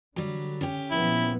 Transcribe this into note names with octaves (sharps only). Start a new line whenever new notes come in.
D3 F#3 G3
C#4 G4
A#2 F3 B3 E4